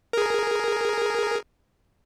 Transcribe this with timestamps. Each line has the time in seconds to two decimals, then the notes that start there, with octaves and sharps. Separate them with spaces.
0.13 G#4 A#4